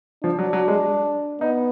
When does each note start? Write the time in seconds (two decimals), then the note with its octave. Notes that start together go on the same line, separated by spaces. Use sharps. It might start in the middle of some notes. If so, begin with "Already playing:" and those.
0.24 F3 D4
0.39 F#3
0.53 F#3
0.68 G#3
1.41 B3 D#4